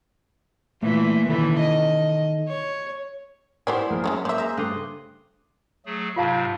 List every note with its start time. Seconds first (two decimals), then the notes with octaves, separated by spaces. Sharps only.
0.83 A#2 E3 A3 A#3
1.29 D#3 E3 A4 B5
1.60 D#5
2.48 C#5
3.67 B3 E4 G4 A#4 C5 D5 G#5
3.90 A#1 G#4 A#4
4.04 F#2 G#3 B3 C#4 C#5
4.25 A#3 C5 D5 E5 F5
4.38 G#4 C5 E5 A#5
4.57 G2 C#3 G3 A3 C6 D6 D#6 F#6
5.86 F#3 A3 G#4
6.16 G#2 C3 F#3 F4 F5 A5